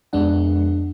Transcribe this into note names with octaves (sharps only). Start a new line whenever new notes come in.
F2 G#3 B3 D4 F#5